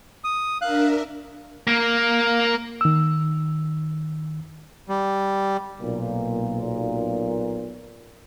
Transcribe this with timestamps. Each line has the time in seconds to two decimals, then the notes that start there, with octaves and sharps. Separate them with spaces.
0.24 D#6
0.62 D4 A#4 E5 F5 F#6
1.67 A#3
2.81 D#3 E6
4.89 G3
5.81 B1 A#2